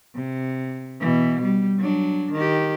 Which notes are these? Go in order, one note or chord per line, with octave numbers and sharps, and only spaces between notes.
C3
B2 E3
G3
F#3 D4
D#3 G4